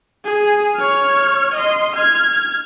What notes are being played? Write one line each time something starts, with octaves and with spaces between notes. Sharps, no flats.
G#4
C#5 F6
D#5 C6
F6 G#6